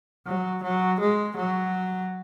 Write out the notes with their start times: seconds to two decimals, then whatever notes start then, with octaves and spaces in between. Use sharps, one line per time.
0.26 F#3
0.63 F#3
1.00 G#3
1.36 F#3